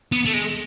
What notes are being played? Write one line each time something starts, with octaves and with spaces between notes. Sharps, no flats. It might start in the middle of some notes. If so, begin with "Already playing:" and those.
B3
A3
G#3